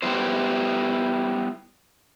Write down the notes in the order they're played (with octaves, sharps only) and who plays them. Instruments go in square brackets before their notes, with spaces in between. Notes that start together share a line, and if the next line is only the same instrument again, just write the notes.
[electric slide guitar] G3 B3 E4 C5